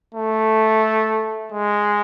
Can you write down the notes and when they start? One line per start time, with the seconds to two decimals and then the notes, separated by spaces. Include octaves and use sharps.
0.14 A3
1.52 G#3